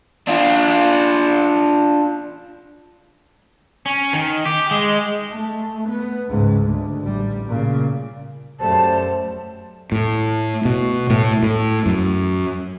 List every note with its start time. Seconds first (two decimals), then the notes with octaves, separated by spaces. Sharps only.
0.27 D4 F4
3.86 C#4
4.13 D#3
4.46 G4
4.71 G#3
5.30 A3
5.89 B3
6.29 C#2 G#2
6.63 D2
7.01 A1 G3
7.49 A#2 C#3
8.60 F#2 F#3 G3 A3 C5 A5
9.92 A2
10.65 B2
11.10 A2
11.43 A2
11.86 F#2